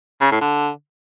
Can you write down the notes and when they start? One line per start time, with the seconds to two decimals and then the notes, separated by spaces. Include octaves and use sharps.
0.21 C#3
0.31 A2
0.41 D3